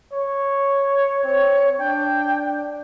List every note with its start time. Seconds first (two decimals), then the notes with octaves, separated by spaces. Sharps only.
0.13 C#5
1.23 C4 C#5
1.79 D4 G5